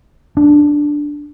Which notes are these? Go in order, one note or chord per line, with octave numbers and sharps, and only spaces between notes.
D4